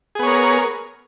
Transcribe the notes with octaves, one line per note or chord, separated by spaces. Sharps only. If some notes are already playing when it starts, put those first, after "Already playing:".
B3 G#4 A#4 C#5